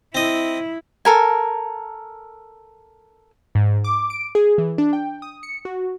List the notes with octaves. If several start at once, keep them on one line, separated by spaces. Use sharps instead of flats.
C4 E4 D#5
A4 A#4 G#5
G#2
D6
D7
G#4
E3
D4
G5
D#6
C#7
F#4